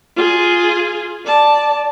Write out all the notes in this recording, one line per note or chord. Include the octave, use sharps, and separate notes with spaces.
F4 G#4
D5 A5